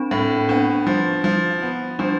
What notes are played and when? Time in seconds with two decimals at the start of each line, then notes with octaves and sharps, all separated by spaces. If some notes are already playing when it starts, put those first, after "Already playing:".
Already playing: C4 D4
0.11 A2 C4
0.49 B3 D4
0.87 F3
1.24 F3
1.62 B3
1.99 F3 D4